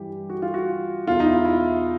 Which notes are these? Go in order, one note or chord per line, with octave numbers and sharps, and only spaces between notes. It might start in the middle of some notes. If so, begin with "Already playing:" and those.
Already playing: G2 E3 G4
F#4
F4
F#4
E2 B2 F4
D#4
E4
E4